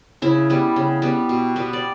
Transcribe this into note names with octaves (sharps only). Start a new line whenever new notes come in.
C#3 E4
G3 B3
C#3
G3 B3
B2
G3 B3
D5